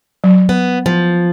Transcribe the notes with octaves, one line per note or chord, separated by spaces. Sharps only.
F#3
B3
F3